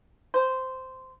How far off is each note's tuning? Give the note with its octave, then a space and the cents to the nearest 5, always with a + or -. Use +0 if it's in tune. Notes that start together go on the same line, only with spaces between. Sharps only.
C5 -10